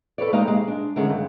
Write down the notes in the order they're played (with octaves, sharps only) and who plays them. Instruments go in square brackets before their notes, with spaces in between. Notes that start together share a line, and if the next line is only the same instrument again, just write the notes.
[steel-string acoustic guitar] A4 B4 C#5 D5
G#3 A#3 D#4 G4 D#5 F5
G#3
D4
D3 D#3 G#3 C#4
G2